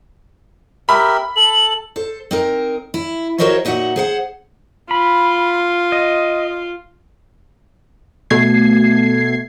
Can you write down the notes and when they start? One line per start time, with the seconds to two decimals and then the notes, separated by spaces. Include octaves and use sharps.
0.89 G4 A#4 E5 B5
1.36 A4 F#7
1.96 A4 C5
2.31 C4 D#4 A#4
2.94 E4
3.38 F#4 A#4 C5 C#5 D#5 E5
3.65 A#2 D#4 F#4 E5 F#5
3.96 G#4 C5 F#5
4.91 F4 B5
5.92 D#5
8.30 B2 A3 G#6 C7